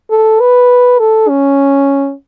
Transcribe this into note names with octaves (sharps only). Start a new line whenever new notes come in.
A4
B4
A4
C#4